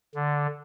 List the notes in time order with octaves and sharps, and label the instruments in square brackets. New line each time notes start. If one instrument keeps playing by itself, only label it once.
[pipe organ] D3